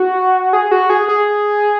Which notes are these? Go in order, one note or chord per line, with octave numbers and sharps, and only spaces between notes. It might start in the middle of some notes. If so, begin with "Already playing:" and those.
Already playing: F#4
G#4
F#4
G#4
G#4